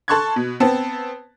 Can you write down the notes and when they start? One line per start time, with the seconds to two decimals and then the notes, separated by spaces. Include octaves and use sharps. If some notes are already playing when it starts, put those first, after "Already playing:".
0.08 A4 A5 C6 C#6 F#6 G#6
0.36 B2
0.60 B3 C4 A5